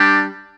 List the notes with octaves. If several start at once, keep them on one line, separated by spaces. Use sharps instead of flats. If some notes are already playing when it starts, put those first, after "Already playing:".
Already playing: G3 D4 G4